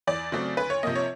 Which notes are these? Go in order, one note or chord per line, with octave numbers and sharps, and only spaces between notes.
E2 D5
C#3 F#3 A3 C4
D2 B4
C#5
C3 F3 A#3 D#5
C#5